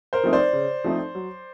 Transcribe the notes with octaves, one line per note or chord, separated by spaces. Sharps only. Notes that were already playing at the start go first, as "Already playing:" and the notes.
A#4 C5
F3 A3 C4 D#4
C5 D5
C#3
F3 A3 C4 D#4
F#3